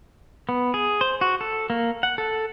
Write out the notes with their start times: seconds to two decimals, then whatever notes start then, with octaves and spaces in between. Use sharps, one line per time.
0.49 B3
0.74 G#4
1.01 C5
1.21 F#4
1.41 A4
1.70 A#3
2.03 F#5
2.18 A4